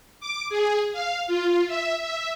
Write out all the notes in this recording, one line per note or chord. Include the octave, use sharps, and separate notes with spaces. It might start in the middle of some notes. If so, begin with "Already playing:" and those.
D6
G#4
F5
F4
E5
E5